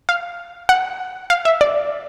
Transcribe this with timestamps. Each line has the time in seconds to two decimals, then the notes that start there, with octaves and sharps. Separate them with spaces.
0.09 F5
0.69 F#5
1.30 F5
1.45 E5
1.61 D5